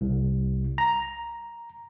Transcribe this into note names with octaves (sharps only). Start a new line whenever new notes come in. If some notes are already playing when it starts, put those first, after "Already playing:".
C2
A#5